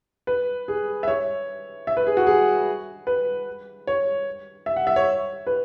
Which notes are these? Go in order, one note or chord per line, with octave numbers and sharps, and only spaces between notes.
B4
G#4
E5
C#5
E5
B4
G#4
F#4
G#4
B4
C#5
E5
F#5
E5
C#5
B4